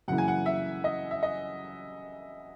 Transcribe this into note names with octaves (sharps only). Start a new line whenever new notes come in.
F#2 C#3 E3 A#3 E4 F#5
G#5
F#5
E5
D#5
E5
D#5